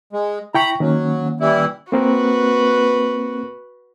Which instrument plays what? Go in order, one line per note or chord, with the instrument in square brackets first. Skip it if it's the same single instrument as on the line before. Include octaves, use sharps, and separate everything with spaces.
[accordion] G#3
[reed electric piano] E4 G5 C#6 [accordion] A#5 B5
[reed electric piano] D#3 A#3 C#4 [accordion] F#3
[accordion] E3 G3 E4
[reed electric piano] A#3 C4 A#4 [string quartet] F#4 B4